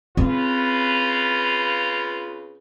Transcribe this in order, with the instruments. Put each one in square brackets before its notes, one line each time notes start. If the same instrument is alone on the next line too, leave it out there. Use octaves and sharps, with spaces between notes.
[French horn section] C#3 F4 B4 [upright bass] C4